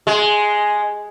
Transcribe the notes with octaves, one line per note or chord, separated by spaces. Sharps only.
G#3